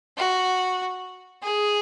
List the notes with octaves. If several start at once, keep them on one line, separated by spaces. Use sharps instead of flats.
F#4
G#4